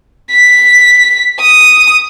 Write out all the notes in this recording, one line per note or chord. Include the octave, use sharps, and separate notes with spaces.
B6
D#6